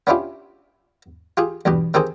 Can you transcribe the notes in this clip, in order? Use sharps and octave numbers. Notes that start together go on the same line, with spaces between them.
B3 C#4 D4 E4 F4 G4
F4 G4 G#4
E2 G2 B2 G4
D#3 C4 D#4 G4 G#4 C5